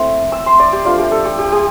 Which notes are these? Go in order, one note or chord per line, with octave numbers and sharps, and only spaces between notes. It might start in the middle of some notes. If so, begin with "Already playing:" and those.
Already playing: A3 C4 E4
E6
C6
D5
G4
F3 A3 D4 F4
G4
A4
G4
G4
G4